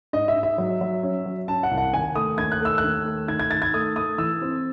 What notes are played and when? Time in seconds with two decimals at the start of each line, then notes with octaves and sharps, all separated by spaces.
0.13 G#2 D#5
0.28 E5
0.36 G#2
0.43 E5
0.58 F#3
0.81 F#3
1.03 C#4
1.26 F#3
1.48 C#4 A5
1.63 F#5
1.71 C2
1.78 F#5
1.93 D#2 G#5
2.15 A3 D#6
2.38 D#2 G#6
2.52 F#6
2.61 A3 E6
2.78 F#6
2.84 D#2
3.06 A3
3.28 D#3 G#6
3.39 G#6
3.51 D#3 A6
3.62 G#6
3.74 A3 D#6
3.96 A3 D#6
4.18 E3 E6
4.41 C4